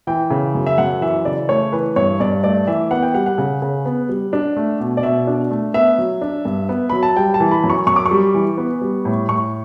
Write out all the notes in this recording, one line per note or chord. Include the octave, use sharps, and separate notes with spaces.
E3 G5
C#3
F#2
E5
F#2 F#5
E3 E5
C#3 D5
A3 C#5
E3 B4
G2 C#5
G2 D5
A3 D5
E3 E5
B3 F#5
G5
G3 F#5
F#5
C#3
C#3
B3
G3
D4
A3
B2
D5
B2 E5
D4
A3
B3 E5
F#3
D4
G2
B3
F#3 B5
A5
G3 G5
A5
E3
B5
F#2
C#6
F#2 C#6
D6
C#6
G3
E3
B3
G3
A2
A2 C#6